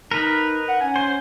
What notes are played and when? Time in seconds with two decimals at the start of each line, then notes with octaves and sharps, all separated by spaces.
0.11 D#4 A#4 B4
0.68 F#5
0.81 C#4 G#5
0.96 C5